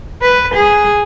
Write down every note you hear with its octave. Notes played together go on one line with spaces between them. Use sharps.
B4
G#4